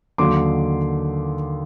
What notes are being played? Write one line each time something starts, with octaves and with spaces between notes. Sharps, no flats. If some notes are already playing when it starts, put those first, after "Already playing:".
D#2 D3 F#3 C6 D6